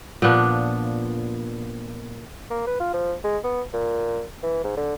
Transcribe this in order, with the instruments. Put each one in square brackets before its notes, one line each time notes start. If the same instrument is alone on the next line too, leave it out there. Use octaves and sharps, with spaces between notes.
[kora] A#2 F3 B3 D4
[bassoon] A#3
B4
F4
F3
G#3
B3
A#2
E3
G#2
D3